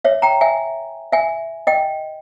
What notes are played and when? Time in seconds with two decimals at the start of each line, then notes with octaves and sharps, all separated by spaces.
0.05 C#5 E5
0.22 G5 A#5
0.41 E5 G#5
1.12 E5 G#5
1.67 D#5 G5